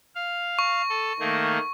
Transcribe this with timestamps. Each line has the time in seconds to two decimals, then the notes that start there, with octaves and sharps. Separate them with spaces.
0.15 F5
0.59 C#6
0.89 A4
1.20 D#3 A3 A#3